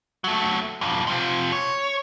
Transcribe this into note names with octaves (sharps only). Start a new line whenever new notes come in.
F#3 A3
B1 F2
C3 F3
C#5